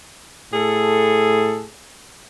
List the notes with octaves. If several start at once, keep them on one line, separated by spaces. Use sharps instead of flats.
A2 G#4 A4